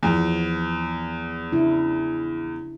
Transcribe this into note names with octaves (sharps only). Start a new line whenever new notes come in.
E2 F3
C#3 D4 E4